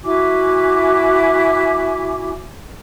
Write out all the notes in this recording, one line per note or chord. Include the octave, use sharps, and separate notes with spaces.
E4 F#4 G#5 D6